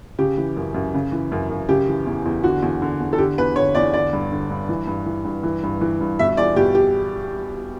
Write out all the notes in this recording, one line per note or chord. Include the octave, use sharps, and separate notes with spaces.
C#3 G4
E3
F#2
F#2
C#3
E3
F#2
F#2
C#3 G4
E3
E2
E2
D3 F#4
E2
D3
E2
A4
D3 G4
E2 B4
D3 C#5
E2 D5
D3 D5
G2
D3
G2
E3
G2
E3
G2
E3
G2
E3
G2
B2 E5
E2 D5
B2 G4
G4